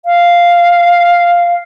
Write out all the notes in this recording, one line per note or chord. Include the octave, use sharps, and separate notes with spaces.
F5